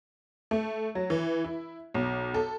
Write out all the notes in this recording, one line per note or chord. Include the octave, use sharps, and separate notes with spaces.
A3
F#3
E3
E4
B1
A4